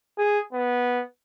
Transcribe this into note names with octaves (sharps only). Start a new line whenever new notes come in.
G#4
B3